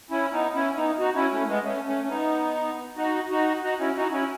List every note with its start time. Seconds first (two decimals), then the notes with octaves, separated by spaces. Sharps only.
0.11 C#4 E4
0.32 B3 D#4
0.54 C#4 E4
0.76 B3 D#4
0.98 D#4 F#4
1.15 C#4 E4
1.32 A3 C#4
1.47 G#3 B3
1.64 A3 C#4
1.86 A3 C#4
2.04 C#4
2.09 B3 D#4
2.96 D#4 F#4
3.30 D#4 F#4
3.63 D#4 F#4
3.79 C#4 E4
3.96 D#4 F#4
4.12 C#4 E4